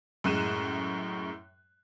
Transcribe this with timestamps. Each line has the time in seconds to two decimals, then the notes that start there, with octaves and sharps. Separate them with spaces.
0.24 F#2 A2 G#3 F#6 D#7 E7